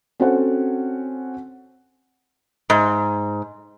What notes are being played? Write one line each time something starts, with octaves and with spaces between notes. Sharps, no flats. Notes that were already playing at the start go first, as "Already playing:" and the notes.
C4 C#4 F#4 A4 C5 F#5
G#2